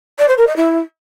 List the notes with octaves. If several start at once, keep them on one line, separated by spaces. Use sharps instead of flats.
D5
C5
A#4
D#5
E4